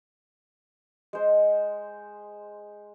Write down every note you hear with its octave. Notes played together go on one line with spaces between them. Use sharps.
G#3 C5